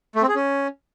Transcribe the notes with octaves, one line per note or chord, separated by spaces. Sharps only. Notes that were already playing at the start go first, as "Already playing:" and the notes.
A3
C4
G#4
C#4